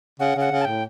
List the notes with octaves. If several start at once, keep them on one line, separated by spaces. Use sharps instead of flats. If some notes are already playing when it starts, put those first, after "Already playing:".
C#3 F#5
C#3 F#5
C#3
A5
A2 G5